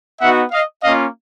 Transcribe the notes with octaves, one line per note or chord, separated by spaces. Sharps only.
B3 D#4 F#4 E5 F#5
D#5 F5
A#3 C#4 F4 D#5 F5